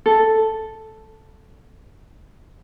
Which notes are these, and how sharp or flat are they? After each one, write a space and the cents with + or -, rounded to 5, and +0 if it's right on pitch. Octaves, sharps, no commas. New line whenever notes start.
A4 +0